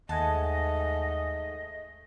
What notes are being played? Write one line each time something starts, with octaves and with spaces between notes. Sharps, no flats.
D#2 G#2 A3 D#5 F#5 G#5 A5